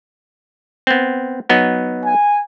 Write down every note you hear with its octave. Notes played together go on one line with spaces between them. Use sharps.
B3 C4
F#3 B3 D#4
G#5